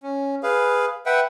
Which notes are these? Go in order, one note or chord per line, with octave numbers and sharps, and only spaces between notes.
C#4
G#4 B4 F5
B4 E5 F#5 G5